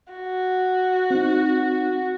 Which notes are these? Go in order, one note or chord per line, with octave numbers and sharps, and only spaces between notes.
F#4
C4 D#4